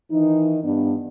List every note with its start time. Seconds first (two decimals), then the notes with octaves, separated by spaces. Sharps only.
0.11 D#3 E3 D#4
0.64 G2 B3 D4